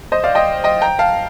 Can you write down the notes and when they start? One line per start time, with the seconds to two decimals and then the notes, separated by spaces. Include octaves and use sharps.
0.12 C5 D#5
0.24 D5 F5
0.35 D#5 G5
0.64 D#5 G5
0.82 G5 A#5
0.99 F5 A5